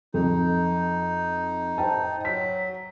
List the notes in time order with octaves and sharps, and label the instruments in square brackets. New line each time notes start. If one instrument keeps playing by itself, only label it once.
[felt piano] F2 [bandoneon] D#4
[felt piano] C5 G5 A5
[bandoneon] F#3 [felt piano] B6